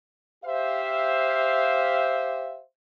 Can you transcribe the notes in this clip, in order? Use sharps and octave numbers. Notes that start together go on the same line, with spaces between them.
G4 C5 E5 F5